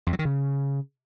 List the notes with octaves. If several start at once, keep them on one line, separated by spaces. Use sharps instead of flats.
F2
F#3
D#3
C#3